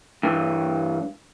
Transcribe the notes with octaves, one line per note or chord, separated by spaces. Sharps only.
G2 E3